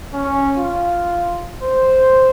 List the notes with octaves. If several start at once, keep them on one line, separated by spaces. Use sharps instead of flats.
C#4
F4
C5